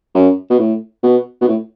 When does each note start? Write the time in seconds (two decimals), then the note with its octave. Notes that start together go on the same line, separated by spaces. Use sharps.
0.15 F#2
0.50 B2
0.59 A2
1.03 B2
1.41 B2
1.48 A2